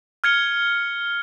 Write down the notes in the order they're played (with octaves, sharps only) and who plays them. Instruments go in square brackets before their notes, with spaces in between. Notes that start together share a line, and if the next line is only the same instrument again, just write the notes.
[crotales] F6 G#6 C#7 G7